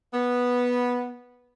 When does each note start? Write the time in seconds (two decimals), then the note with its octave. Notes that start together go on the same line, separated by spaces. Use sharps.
0.13 B3